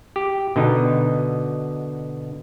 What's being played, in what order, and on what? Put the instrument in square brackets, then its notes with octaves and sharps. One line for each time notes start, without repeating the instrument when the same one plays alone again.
[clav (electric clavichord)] G4
B2 D3 D#4